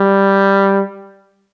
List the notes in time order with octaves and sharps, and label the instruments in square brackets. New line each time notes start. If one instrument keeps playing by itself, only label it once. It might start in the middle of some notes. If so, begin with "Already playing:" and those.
Already playing: [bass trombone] G3